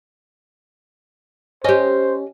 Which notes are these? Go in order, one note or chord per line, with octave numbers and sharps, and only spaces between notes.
C#4 G4 C5 D#5